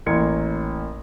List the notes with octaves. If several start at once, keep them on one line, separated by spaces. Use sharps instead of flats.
A1 A#3 C6 G#6 C#7